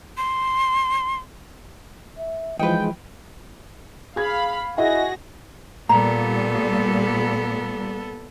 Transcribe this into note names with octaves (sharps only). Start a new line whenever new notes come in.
C6
E5
E3 F3 G#3 D#4 B4 G5
G#4 F5 B5 G#6
E4 F#4 G#4 D#5 E5 A#6
A#2 G3 B3 A4 A#5